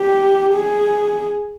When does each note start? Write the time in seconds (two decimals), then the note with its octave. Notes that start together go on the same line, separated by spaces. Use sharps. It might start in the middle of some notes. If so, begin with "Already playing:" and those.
Already playing: G4
0.55 G#4